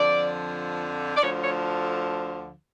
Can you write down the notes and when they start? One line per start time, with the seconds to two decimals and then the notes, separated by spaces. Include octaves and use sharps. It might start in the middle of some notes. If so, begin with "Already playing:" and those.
Already playing: F2 D3 F3 D5
1.16 D5
1.21 D2 D3 F3 C#5
1.44 C#5